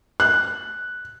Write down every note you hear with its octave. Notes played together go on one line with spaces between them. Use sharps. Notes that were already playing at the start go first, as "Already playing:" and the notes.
F#6